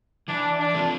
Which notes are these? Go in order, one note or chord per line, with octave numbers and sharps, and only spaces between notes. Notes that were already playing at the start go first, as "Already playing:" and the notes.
E3 D4
D4
A3 C4 F4